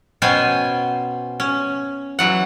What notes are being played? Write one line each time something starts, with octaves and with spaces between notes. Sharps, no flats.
B2 B3 C#4 C5 G5 G#5
C#4
E3 F#3 F#5